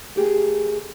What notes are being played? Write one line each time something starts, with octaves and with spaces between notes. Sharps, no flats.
A3 G4 G#4 A#4